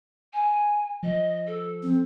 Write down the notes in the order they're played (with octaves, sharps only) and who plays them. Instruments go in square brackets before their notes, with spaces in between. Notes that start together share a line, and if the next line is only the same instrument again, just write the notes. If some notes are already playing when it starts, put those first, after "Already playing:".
[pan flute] G#5
[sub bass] F3 [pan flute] D#5
[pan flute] A4
[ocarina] C4